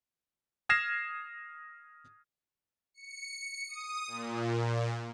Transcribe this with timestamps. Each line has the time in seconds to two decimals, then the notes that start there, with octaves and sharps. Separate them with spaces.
0.69 D#6 F6 G#6 A#6 C7 E7
2.94 C#7
3.69 D#6
4.07 A#2